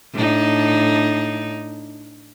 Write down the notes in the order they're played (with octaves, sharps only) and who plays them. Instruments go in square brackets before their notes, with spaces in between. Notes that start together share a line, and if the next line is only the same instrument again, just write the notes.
[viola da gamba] A2 D4 D#4